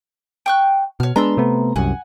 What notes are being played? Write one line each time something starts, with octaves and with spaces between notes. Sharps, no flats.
G5 C#6 F#6
B2 C#5 F6
G#3 B3 D4 A#5 C6 E6
C3 A3 B3
C2 F#2 F#5 G#5